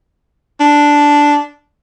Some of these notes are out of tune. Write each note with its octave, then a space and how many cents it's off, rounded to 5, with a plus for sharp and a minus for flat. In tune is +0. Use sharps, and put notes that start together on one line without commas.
D4 -5